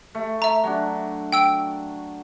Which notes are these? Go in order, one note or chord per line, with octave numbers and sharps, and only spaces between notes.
A3
E5 A#5
F#3 D4
G5 E6 D7